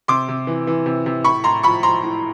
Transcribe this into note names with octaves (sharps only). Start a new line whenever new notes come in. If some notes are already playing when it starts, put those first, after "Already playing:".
C3 C6 D6
C3
E3
E3
C3
C3
A2 B5 C#6
A2 A#5 C6
F3 B5 C#6
F3 A#5 C6
A2